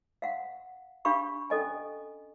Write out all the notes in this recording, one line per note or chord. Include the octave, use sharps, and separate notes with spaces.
F5 F#5
D4 G4 F5 B5 C#6
C#4 A4 D#5 G#5